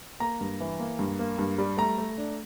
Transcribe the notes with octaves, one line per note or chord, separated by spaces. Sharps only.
A#3 A#5
G2
E3
A#3
G2
A#3
G2
G3
A3 A#5
A3
D4